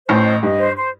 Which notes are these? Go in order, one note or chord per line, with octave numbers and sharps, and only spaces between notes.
A1 A2 C5
D#5
G2 D#5
C5
C5